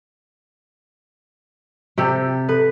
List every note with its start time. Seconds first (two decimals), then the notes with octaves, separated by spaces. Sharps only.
1.98 C3 G4 A4
2.49 A4 B4